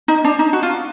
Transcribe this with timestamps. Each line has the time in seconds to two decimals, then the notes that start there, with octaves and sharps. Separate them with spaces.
0.08 D#4
0.24 D4
0.39 D#4
0.53 F#4
0.63 F4